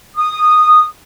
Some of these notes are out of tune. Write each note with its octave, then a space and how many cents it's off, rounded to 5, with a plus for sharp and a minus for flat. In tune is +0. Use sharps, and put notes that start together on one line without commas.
D#6 -15